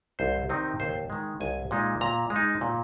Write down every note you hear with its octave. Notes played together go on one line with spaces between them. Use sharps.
C2 C5
C3 D#3 C4 D#4
D#2 C5
D#3 G#3
C2 G#5
A#2 G#3 D#4
A#2 A#5
G#3
D#4
A#2